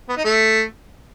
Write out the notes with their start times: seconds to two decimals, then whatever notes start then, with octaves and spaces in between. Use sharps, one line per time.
0.09 B3
0.17 D#4
0.25 A3